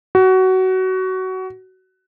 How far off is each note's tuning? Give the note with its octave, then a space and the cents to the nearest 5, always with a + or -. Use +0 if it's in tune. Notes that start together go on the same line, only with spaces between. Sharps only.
F#4 +20